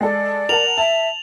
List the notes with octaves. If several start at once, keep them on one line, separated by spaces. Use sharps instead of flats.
G#3 A4 D5
A#4 F#5 A5 F7 F#7
E5 A5